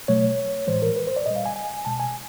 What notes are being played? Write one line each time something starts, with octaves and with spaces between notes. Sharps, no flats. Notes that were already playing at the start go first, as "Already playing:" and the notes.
B2 F#3 A3 C#5
A2 E3 G#3 C5
A#4
B4
C5
D5
A#2 G3 D#5
F5
G#5
G#5
B2 G#3 A5
G#5